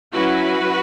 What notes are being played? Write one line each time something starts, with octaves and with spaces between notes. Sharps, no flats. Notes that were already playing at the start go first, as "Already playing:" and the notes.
F#3 C#4 E4 F#4 B4